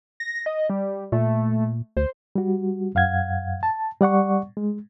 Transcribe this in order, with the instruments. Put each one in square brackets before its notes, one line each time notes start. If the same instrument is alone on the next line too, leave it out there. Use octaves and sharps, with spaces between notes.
[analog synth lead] A#6
D#5
G3
[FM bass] A#2 [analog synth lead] A3
[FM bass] D2 [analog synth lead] C5
[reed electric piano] G3 F#4
F#2 F5 F#5 G#6
A5
G3 D5 F#5 C#6
G#3